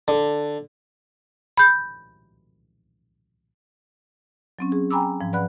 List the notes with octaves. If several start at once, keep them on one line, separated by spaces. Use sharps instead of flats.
D3
B5 G6
F#3 C4 C#4
G#4
G5 G#5 A#5 B5 D6 E6
G#2 F3
B4 D5 F#5 B5 F#6